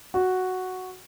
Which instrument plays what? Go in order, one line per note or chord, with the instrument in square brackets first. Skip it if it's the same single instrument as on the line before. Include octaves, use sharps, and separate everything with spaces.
[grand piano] F#4